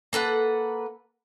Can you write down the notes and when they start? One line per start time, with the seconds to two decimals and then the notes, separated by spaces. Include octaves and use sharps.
0.13 A#3 A4 B4 F#5